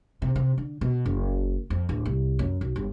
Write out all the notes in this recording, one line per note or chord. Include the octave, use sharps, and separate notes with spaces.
C3
C3
D3
B2
F#1
F2
D1
C2
F#2
B1
G1